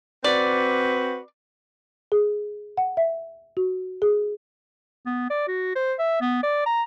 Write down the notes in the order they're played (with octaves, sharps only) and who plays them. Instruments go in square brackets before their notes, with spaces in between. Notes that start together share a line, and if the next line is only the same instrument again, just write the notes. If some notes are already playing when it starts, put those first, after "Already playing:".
[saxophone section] C4 F#4 B4 [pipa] D5
[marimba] G#4
F#5
E5
F#4
G#4
[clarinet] B3
D5
F#4
C5
E5
B3
D5
A#5